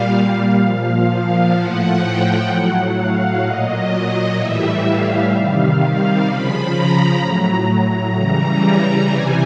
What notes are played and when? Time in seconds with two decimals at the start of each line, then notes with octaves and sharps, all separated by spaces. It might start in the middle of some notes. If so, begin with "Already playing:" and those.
Already playing: A#2 G3 F5
0.60 A#2 F3
1.55 A2 F3 F#5
2.02 G5
2.49 A2 F#3 F#5
2.96 F5
3.43 A#2 F#3 D#5
4.37 A2 E3 G3 E5
4.84 F5
5.31 C3 D#3 G3
6.25 C#3 F3 B5
6.73 A#5
7.19 A2 F#3 A#5
7.67 A#5
8.14 C#3 E3 G3
9.08 C3 E3 G3 G#5